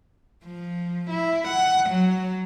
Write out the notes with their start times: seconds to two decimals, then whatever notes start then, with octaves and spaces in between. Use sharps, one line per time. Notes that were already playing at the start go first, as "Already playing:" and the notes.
0.44 F3
1.10 E4
1.48 F#5
1.90 F#3